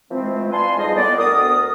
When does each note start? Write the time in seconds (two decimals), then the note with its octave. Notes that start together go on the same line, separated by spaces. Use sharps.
0.11 E3 F3 G#3 A3 C4
0.52 B4 D5 F5 G#5 A5 C6
0.77 F2 G#2 G3 F4 C5 D#5
0.96 A2 B3 D5
1.17 D2 B3 A#4 D#6